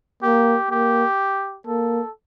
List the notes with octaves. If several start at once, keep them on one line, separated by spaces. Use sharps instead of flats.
A#3 G4
A#3 G4
A#3 A4